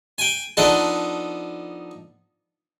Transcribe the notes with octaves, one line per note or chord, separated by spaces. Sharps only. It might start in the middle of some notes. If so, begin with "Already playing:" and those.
G5 G#5
F3 B3 D4 D#4 A4